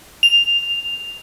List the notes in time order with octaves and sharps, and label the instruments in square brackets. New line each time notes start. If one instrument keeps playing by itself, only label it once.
[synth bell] F7